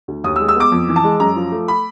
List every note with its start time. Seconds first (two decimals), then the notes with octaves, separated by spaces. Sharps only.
0.08 D2
0.24 D#2 D#6
0.36 E6
0.40 G#3
0.48 E6
0.56 B3 D6
0.72 F2
0.89 E3
0.96 A5
1.04 G#3
1.20 F#2 A#5
1.36 F3
1.52 A3
1.68 B5